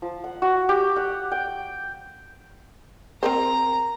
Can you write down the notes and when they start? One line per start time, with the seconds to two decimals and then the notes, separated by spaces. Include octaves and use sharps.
0.02 F3
0.24 F#5
0.42 F#4
0.69 G4
0.96 F#5
1.31 G5
3.23 C4 A#4 C5 A#5